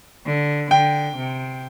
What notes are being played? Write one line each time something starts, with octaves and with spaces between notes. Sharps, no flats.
D3
D3 G5
C3